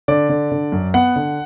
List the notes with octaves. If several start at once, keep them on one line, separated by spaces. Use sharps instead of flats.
D3 D5
D3
D3
F#2
B3 F#5
D3